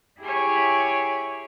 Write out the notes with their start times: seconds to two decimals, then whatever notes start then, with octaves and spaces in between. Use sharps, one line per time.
0.22 E4 G4 G#4 C#5 G#5 D6